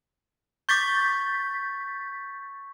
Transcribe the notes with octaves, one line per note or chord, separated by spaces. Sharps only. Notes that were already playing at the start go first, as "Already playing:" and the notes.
C#6 D6 G6 A6 B6